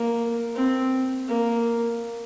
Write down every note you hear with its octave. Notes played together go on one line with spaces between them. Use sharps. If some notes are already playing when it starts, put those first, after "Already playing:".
Already playing: A#3
C4
A#3